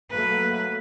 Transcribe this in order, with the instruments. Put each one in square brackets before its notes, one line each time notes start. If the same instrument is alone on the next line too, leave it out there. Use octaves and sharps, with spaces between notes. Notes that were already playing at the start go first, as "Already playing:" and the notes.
[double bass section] F#3 A3 A#3 [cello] B4